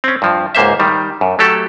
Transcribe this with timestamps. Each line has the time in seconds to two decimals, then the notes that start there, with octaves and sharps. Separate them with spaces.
0.04 C4 C#4
0.22 G2 F3
0.55 C#2 G#2 A#3 C5 E5
0.80 D#3 G3
1.21 F#2
1.39 F#3 A3 G4 A4